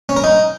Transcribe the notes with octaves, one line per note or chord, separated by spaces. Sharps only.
C#4
A#4
D#4